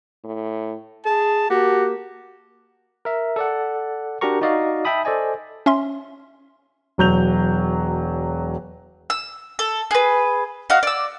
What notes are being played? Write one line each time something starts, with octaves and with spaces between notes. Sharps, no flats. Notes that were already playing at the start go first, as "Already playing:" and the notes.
A2
G#4 A5
A#3 F#4 G4
A#4 E5
A4 D5 F#5
D4 F#4 G4 A#4 A#5 C#6
D#4 F#4 D5 D#5 F5
E5 G5 A5 B5 D#6
A4 C5 D5 D#5 G#5
C#4 E5 C6
E1 F#3 G6 F7
E6
A4
G#4 B4
F#4 D#5 F5
D5 E6